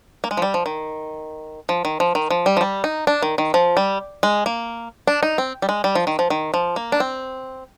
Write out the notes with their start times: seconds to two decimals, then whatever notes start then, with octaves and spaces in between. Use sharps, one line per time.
0.24 A#3
0.31 G#3
0.37 F3
0.42 G3
0.54 F3
0.66 D#3
1.69 F3
1.85 D#3
2.00 F3
2.15 D#3
2.30 F3
2.46 G3
2.57 F3
2.61 G3
2.84 D#4
3.07 D4
3.22 D#3
3.38 D#3
3.54 F3
3.77 G3
4.23 G#3
4.46 A#3
5.07 D4
5.23 D#4
5.38 C4
5.62 G3
5.69 G#3
5.84 G3
5.95 F3
6.07 D#3
6.19 F3
6.30 D#3
6.54 F3
6.76 A#3
6.92 D4
7.00 C4